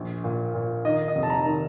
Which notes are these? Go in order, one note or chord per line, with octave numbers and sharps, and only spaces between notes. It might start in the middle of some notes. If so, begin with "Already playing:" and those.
Already playing: A#1
A#2
A#2
D#3 D#5
D#5
F1
A5
A#5
D#3